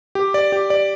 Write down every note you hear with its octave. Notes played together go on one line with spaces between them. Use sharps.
G4
D5
G4
D5